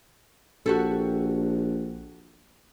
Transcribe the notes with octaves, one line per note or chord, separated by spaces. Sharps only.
A#1 F#4 G4 A4